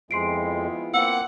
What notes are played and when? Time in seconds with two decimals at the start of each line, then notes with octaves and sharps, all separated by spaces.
0.11 F2 G#3 B3 E4 F4 C6 C7 D7
0.94 A#3 C4 F#5 E6